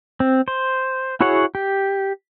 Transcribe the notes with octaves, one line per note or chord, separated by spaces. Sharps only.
C4
C5
E4 F#4 G#4 C#5 F#5
G4